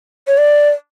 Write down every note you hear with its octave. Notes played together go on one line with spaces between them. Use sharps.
C#5
D5